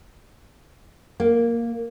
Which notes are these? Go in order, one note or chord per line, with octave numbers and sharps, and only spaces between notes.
A#3